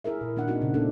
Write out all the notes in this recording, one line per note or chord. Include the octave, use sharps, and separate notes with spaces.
E4 G#4 A#4 E5
A#2
D#3 A#3 D4 F#5
A#3 C4 D#4 F#4
A#2 C#3
A3 B3 C4 D4 E4 A4